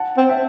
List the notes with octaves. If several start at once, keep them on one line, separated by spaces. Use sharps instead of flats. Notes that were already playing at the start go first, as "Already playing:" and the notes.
Already playing: F#5 A5
C4
E5 G5